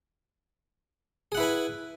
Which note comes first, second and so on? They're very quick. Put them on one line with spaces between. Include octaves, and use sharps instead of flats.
G#4 F#5 E4 B4 G#5